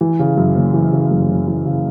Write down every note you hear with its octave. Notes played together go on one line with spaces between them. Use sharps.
E3
C#3
F#2
F#1
E3
C#3
F#2
F#1
E3
C#3